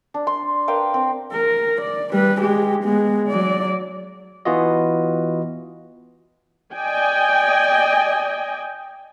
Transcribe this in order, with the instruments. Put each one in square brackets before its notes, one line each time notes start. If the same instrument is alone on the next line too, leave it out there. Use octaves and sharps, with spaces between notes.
[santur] D4
C6
A#4 B4 F5 G5
C4
[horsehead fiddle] A#4
D5
G3 B4
G#3 G4
G#3 B3
F#3 D5
[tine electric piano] E3 B3 F4 F#4 D#5
[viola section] D5 D#5 G5 G#5